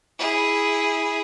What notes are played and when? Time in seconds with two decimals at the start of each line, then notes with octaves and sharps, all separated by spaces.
0.19 E4 G#4